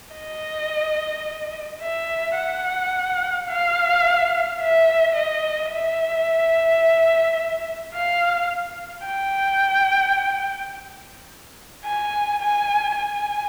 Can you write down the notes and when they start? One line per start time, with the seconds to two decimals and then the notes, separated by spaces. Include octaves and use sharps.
0.15 D#5
1.83 E5
2.37 F#5
3.49 F5
4.62 E5
5.16 D#5
5.73 E5
7.95 F5
9.07 G5
11.85 G#5
12.42 G#5
12.96 G#5